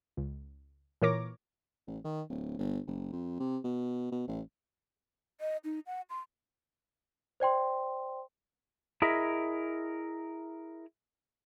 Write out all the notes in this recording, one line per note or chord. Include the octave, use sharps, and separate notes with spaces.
C#2
A#2 E3 A#4 C#5 D6 A#6
A1
D#3
D1
G1
F#1
F2
C3
B2
B2
A1
D#5
D#4
F#5
C6
C5 D5 G5 C6
E4 G#4 A#4 D#5 E5